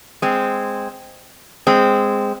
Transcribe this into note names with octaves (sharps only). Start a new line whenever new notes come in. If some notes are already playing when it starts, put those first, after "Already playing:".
G#3 C4
G#3 C4